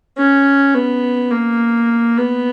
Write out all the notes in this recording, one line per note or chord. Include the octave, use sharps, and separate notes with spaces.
C#4
B3
A#3
B3